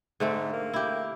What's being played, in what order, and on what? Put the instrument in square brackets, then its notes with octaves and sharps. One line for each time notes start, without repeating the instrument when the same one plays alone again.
[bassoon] G#2 [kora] D3 A3 C4
[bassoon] A#3
[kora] E4 G4